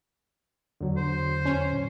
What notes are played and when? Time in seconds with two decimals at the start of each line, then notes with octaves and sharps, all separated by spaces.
0.81 E2 D3 F#3
0.97 C5
1.45 C#4
1.72 A#2